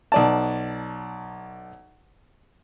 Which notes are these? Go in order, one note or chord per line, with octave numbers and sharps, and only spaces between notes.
B1 D5 A5